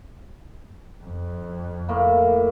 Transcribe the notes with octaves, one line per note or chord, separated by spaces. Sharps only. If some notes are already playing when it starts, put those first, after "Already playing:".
F2
A2 A#3